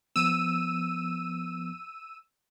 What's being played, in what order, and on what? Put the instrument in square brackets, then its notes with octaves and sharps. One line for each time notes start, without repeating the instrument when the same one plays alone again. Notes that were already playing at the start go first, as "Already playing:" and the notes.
[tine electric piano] F3 B3 [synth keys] E6 D#7